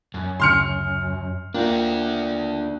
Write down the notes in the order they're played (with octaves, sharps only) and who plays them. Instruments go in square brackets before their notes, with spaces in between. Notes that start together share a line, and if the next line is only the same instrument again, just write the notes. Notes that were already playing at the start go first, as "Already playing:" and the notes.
[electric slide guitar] F#2
[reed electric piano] D2 C#3 [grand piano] C6 F6 C#7
[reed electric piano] A#3 F4 G5 [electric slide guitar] D4 F#4